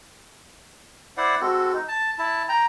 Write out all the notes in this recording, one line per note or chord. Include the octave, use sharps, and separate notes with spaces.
E4 C5 D5 F#5
G#3 C4 F#4 A4
D#4
A5
E4 A5
G5 A#5